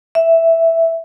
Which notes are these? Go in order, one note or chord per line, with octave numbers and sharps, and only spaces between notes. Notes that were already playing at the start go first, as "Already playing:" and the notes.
E5